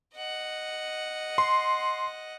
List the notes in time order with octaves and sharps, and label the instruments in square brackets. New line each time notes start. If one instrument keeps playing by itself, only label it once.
[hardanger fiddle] D#5 F#5
[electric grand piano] C6